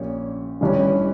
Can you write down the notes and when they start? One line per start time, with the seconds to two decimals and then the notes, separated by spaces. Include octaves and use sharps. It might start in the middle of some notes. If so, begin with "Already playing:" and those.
Already playing: A#1 A#2 C#4 G4
0.61 A1 G2 E3 G3 C#4